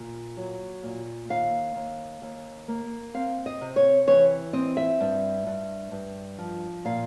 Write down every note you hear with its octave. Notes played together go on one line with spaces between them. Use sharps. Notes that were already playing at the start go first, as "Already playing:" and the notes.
Already playing: A#2
F#3
A#2
D#2 F5
D#2
D#2
A#3
C4 F5
D#5
C3
C#5
E3 C#5
C4 D#5
E5
G2
G2
G2
F3
A#2 F5